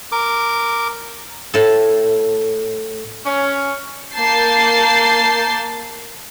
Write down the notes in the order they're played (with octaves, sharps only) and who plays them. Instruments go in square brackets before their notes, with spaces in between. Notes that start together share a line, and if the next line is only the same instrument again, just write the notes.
[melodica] A#4 D6
[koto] A2 A4
[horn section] C#4
[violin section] A#3 A5 G6 A6 C7